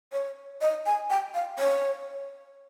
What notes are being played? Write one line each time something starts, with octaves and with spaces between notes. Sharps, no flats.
C#5
D#5
G#5
G5
F5
C#5